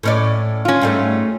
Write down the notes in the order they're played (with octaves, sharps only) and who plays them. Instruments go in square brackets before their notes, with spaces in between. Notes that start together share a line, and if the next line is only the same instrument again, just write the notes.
[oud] A2 C#4 D5
[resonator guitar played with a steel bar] C#4 F4
[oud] G#2 G3 A3